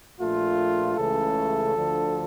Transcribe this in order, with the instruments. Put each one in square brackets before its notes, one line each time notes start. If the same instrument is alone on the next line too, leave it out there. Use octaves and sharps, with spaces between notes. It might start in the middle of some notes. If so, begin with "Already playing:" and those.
[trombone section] A#1 A#2 A3 F4
C#2 C#3 E3 A3 A4
D2 D3 F3